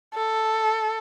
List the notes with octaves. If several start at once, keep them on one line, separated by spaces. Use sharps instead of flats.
A4